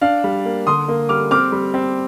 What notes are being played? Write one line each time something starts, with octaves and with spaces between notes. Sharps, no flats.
D4 F5
G3
A#3
D3 C6 D#6
A#3
G3 D6 F6
C4 D6 F6
G3
C4